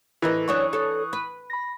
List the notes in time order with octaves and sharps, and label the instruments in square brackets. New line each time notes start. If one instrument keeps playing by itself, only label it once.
[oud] A2 A#4 D#5 [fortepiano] E3
[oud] F#2 D4 C#5 [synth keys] C#6 D#6 F#6
[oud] A4 C#5
B4
[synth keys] B5 A#6